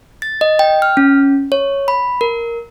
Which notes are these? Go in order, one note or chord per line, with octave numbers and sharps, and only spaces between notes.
A6
D#5
G5
F6
C#4
C#5
B5
A#4